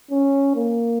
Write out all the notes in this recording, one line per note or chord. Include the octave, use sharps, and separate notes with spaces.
C#4
A#3